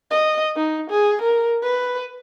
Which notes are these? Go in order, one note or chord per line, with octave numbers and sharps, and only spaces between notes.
D#5
D#4
G#4
A#4
B4